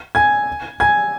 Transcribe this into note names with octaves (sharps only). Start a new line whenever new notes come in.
G#5 G#6
G#5 G#6